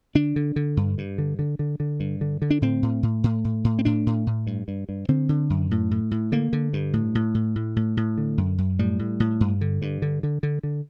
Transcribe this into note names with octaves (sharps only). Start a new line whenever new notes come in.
D3 D4
D3
D3
G2
G2
D3
D3
D3
D3
G2
D3
D3
D4
A2 C4
A2
A2
A2
A2
A2
C4
A2 D4
A2
A2
G2
G2
G2
D3 C4
D3
F#2
A2
A2
A2
D3 A#3
D3
G2
A2
A2
A2
A2
A2
A2
D3
F#2
F#2
A2 G3
A2
A2
G2
D3
G2
D3
D3
D3
D3